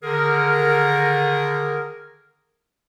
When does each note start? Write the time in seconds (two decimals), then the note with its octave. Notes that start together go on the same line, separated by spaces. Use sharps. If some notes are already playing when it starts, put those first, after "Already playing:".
0.03 D3 D#3 G#4 A#4